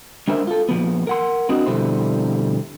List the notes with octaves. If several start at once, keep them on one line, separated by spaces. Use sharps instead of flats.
G#3 C#4 D4 A#4 C5 E5
F4 A4
A#2 F3 B3
A#4 F#5 C6
C4 D4 F#4 A#4 D#5
F2 B2 D3 G3 E4 C5